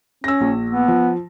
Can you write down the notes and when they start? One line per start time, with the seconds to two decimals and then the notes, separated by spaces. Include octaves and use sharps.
0.24 C#4 E6 A#6
0.41 A#1
0.70 B3
0.88 F3